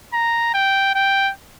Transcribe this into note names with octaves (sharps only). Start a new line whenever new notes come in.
A#5
G5
G5